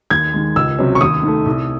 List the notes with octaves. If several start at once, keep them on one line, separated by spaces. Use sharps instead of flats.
D#2 G#6
D#3 G#3
C#2 E6
C3 F#3 C#4
C#6
D#2 D#6
D#3 A3
C2